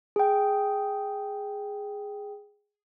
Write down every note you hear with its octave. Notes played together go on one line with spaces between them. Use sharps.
G#4 G5